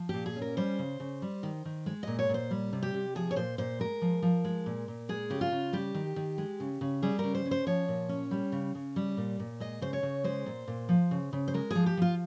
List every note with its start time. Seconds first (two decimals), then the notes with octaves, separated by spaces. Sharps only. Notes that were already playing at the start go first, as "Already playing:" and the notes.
Already playing: F3
0.09 A#2 G4
0.26 G#4
0.36 C#4
0.42 A#4
0.57 G3 C5
0.79 C#3
1.00 C#3
1.22 G3
1.43 D#3
1.65 D#3
1.86 G#3
2.03 A#2 D#5
2.19 C#5
2.29 A#2 C5
2.51 G3
2.73 C3
2.83 G4
2.94 C3
3.15 F3 G#4
3.31 C#5
3.36 A#2 C5
3.58 A#2 C5
3.80 G#3 A#4
4.02 F3
4.22 F3
4.45 G#3
4.66 A#2
4.88 A#2
5.09 G#3 G#4
5.30 C#3 G4
5.41 F4
5.52 C#3
5.73 G3 G4
5.94 D#3
6.16 D#3
6.38 G#3
6.60 C#3
6.81 C#3
7.03 G3 G#4
7.19 C#3 A#4
7.35 C5
7.46 C#4
7.51 C5
7.67 F3 C#5
7.88 A#2
8.09 C#4
8.31 G3
8.52 C#3
8.75 C#3
8.96 G3
9.17 A#2
9.39 A#2
9.60 G#3 D#5
9.81 C#3 C5
9.93 C#5
10.03 C#3
10.24 G#3 C5
10.46 A#2
10.68 A#2
10.89 F3
11.11 C#3
11.33 C#3
11.48 C5
11.54 G#3 A#4
11.71 F3 G#4
11.86 G4
11.97 F3 F4